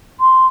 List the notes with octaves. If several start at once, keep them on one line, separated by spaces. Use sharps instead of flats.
C6